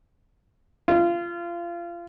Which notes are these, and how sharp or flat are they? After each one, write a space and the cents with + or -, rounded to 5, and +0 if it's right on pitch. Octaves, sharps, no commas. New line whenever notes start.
F4 -25